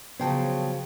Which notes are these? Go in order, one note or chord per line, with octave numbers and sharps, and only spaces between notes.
C#3 F3 F#3 B3 C5 G5 A5